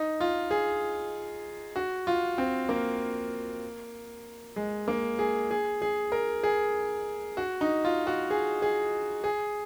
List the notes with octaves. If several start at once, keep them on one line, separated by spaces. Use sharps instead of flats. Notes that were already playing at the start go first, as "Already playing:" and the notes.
Already playing: D#4
F4
G#4
F#4
F4
C4
A#3
G#3
A#3
G#4
G#4
G#4
A#4
G#4
F#4
D#4
F4
F#4
G#4
G#4
G#4